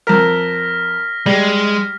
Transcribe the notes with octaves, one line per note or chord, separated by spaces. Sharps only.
F2 A#4 F6 A#6 B6
G3 G#3